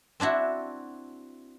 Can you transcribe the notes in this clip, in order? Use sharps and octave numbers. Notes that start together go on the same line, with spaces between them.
C4 D4 E4 F#4